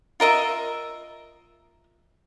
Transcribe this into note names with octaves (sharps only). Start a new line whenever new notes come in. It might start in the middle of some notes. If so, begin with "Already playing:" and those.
F4 A#4 D#5 E5